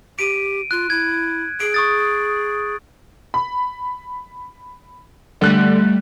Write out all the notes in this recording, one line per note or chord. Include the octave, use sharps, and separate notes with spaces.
G4 D7 D#7
F4 F#6
E4 G#6
G#4 D7
C#6 D#6 A6
B5
D3 G3 A3 F#6